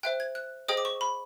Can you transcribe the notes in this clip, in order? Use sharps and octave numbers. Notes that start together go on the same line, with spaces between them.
C5 E5 G5 F#6
G#6
F#6
G#4 C5 D#5 G5 D#6
D6
C#6
B5